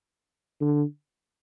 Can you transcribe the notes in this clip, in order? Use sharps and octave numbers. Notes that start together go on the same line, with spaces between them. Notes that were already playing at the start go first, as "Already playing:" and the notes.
D3